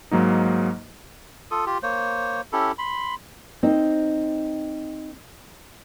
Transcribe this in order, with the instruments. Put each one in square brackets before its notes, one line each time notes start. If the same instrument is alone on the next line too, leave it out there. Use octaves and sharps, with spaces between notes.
[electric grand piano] G#2 F#3 A#3 D#4
[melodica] F4 A4 D#6
F4 G4
A#3 C5 C#5
C#4 E4 G4 A4
B5 C6
[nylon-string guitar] C4 D#4